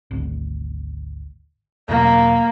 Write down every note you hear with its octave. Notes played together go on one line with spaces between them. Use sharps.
G#1 D2
E2 B2 F#3 A#3